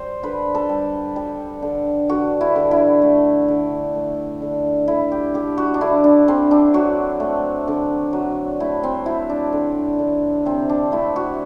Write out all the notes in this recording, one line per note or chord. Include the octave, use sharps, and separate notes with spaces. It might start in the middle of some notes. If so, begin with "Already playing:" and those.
Already playing: G3 C5
D3 B4
A4
G3
G3
D3
D3 F#4
E4
D3
E4
A3
D3
A3
D3
D3 E4
G4
D3 G4
F#4
D4
D3 E4
D4
D3 C4
D4
F#3 F#4
A3
D3
F#3
A3 E4
C4
F#3 E4
D4
D3
D3
C3 C4
D4
A3 E4
F#4